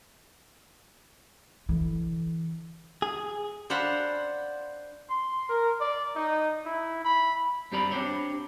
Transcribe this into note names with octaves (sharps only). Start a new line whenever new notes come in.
D3 E3
G#4
D4 C5 F5 F#5 A5 B5
C6
A#4
D5
D#4
E4
B5
G2 C4 G4 D5 A#5 B5
C4 D4 D#4 G4 C5 C#5